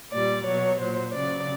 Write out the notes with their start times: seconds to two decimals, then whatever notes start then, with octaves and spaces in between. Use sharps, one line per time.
0.12 A#2 G3 D5
0.45 B2 F#3 C#5
0.80 A#2 F#3 C5
1.13 C#3 F#3 D5